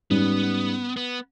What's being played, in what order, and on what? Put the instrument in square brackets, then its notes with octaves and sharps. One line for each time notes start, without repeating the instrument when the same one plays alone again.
[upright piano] G#2 G3 C#4 [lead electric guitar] B3
[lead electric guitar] B3